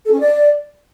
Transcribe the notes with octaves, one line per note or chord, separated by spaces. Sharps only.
A4
C#4
D5